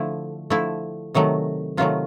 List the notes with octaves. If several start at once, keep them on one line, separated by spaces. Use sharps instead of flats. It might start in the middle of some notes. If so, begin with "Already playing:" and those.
Already playing: D3 F3 A3 E4
D3 F3 A3 E4
C3 D#3 F#3 A3
C3 D#3 F#3 A3 F4